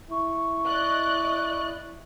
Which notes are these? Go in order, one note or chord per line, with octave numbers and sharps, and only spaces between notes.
E4 C#6
D5 D#5 F#6